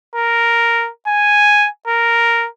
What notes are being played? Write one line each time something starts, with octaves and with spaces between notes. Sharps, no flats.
A#4
G#5
A#4